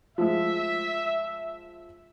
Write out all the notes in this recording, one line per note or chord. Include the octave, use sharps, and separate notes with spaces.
F3 G#3 E5